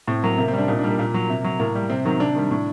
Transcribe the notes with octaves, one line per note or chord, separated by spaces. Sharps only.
A2 C4
F#3 A#3
C3 A#3
C4
G3 D4
A#2 D#4
D4
G3 A#3
A#2 A#3
F#3
C3
F#3
A2 A#3
G3
C3 C4
D#3 F#3
C3 D4
D#3 G3
A2